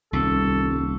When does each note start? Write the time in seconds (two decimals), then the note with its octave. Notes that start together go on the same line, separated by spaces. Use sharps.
0.13 D#1 C2 A4